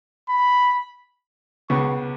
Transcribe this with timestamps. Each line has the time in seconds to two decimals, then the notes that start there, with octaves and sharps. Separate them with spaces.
0.29 B5
1.70 C#2 C#3 B3 C#6